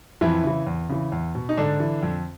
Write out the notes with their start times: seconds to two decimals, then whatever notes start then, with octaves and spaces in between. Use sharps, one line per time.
0.21 F2 E3 E4
0.44 C#3 E3
0.67 E2
0.89 C#3 E3
1.12 E2
1.35 B2
1.49 D#4
1.57 G#2 D3 D4
1.80 E3
2.03 F2